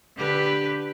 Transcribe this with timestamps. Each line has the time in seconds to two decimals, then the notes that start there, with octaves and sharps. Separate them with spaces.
0.16 D3 G4 B4